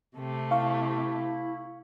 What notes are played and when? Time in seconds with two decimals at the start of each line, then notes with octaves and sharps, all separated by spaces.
0.16 C3 A3 G4
0.51 E4 F5 C#6